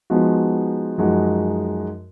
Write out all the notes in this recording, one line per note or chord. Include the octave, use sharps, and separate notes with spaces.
F3 G#3 B3 D#4 F#4
F#2 F3 G#3 D#4 F#4